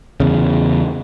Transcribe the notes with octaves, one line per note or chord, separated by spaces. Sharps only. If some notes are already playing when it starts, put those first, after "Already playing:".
E2 C#3